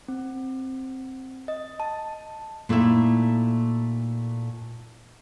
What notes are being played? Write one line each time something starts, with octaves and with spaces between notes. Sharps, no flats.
C4
D#5
A5
A#2 A3 D#4 E4 E5